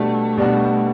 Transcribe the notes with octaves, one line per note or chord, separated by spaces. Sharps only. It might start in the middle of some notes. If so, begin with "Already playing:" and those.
Already playing: B2 G3 A3 D4 F#4
B2 G3 D4 F#4